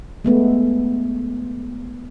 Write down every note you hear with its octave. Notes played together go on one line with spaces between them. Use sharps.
G#3 A3 B3